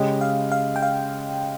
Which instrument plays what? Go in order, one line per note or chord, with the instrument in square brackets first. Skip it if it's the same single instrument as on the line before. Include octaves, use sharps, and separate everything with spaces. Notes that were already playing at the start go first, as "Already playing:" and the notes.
Already playing: [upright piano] C#3 G#3 C#4 G4 [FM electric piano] D#5
[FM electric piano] F5
F5
G5
F5